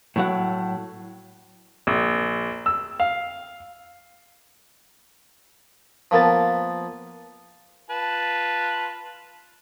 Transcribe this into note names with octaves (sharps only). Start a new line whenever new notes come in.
A2 F#3 F#5
A#1
E6
F5
F3 A#3 B3 A5
F4 B4 A5